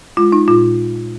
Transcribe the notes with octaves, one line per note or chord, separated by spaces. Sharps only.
G#3 F4
D#4
A#2 F4